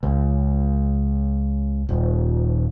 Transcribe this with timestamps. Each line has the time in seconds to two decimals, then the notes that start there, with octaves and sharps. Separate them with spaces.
0.03 C#2
1.89 D#1